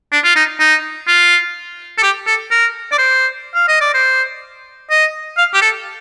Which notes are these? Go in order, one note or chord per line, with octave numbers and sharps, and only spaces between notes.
D4
F4
D#4
D#4
F4
A4
G4
A4
A#4
D5
C5
F5
D#5
D5
C5
D#5
F5
G4
A4